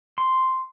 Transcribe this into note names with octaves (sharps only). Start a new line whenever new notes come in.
C6